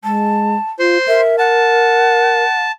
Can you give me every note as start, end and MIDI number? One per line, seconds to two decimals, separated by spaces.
0.04 0.56 56
0.04 0.71 81
0.79 0.98 65
0.79 1.21 72
0.79 1.21 84
1.08 2.44 70
1.08 1.36 76
1.38 2.64 78
1.38 2.72 81